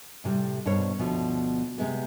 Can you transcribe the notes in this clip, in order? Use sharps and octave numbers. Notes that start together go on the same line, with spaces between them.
A2 C3 G3
G2 B2 A#4 C5 C#5
D2 B2 F3
C3 G#3 B3